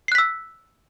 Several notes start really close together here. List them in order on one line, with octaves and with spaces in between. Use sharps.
C7 F#6 B6 E6